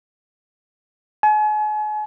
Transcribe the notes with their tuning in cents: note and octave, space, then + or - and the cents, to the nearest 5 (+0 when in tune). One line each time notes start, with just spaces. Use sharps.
G#5 +40